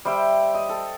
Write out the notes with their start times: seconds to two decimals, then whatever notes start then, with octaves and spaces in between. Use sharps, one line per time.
0.05 G3 C5 E5 G5
0.55 D#5
0.69 A4